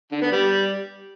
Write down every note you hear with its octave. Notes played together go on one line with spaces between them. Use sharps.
D3
B3
G3